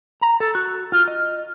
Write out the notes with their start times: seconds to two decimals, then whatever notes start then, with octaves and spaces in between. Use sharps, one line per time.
0.21 A#5
0.40 A4
0.55 F#4
0.92 F4
1.08 D#5